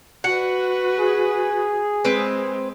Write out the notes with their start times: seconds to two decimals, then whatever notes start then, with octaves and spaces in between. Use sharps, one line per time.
0.24 F#4 B4 F#5
0.99 G#4
2.05 G#3 C4 B4